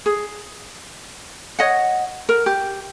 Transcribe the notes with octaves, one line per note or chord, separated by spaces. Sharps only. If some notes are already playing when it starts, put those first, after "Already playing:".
G#4
C#5 D#5 F#5
A#4
G4